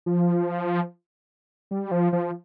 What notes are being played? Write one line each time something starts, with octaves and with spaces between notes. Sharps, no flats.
F3
G3
F3
F3